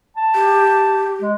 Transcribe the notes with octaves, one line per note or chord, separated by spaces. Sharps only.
A5
G4
G#3